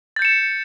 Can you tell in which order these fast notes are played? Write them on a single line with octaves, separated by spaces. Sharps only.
A6 G6 C#7 E7